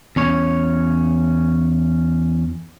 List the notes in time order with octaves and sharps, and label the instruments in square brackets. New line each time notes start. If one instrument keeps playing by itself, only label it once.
[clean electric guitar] E2 C#4 C#5